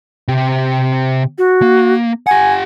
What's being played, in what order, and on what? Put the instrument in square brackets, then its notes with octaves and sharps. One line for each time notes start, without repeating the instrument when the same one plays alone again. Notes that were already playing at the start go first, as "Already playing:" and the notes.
[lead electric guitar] C3 G4
[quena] F#4
[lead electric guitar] A#3
[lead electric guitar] G4 F#5 [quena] G#5